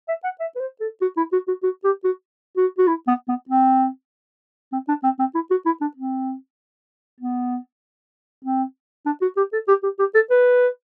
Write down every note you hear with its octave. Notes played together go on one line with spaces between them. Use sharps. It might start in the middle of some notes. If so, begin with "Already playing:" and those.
E5
F#5
E5
B4
C5
A4
F#4
E4
F#4
F#4
F#4
G4
F#4
F#4
F#4
E4
B3
B3
C4
C4
D4
C4
C4
E4
F#4
E4
D4
C4
B3
C4
D4
F#4
G4
A4
G4
G4
G4
A4
B4